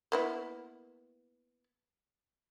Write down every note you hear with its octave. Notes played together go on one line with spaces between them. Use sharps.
A#3 B3 E4